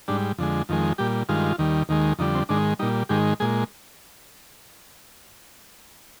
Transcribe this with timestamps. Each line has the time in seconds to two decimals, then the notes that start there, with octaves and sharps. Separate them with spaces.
0.08 G#2 G3 D4
0.38 F2 D3 G#3
0.69 F2 D#3 G#3
0.98 A#2 G3 G4
1.29 G2 D#3 G#3 F4
1.59 D#2 D#3 G3
1.89 D#2 D#3 G#3
2.19 F2 D3 G3 D#4
2.35 C4
2.49 G#2 D#3 G#3 D4
2.79 A#2 G3 D#4
3.09 G#2 D#3 G#3 G4
3.40 A#2 G#3 G#4